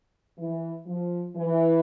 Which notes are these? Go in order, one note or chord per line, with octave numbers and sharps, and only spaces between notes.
E3
F3
E3